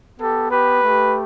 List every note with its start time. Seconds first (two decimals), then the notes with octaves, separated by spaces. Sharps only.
0.18 B3 G4 A4
0.50 G4 B4
0.81 A3 G4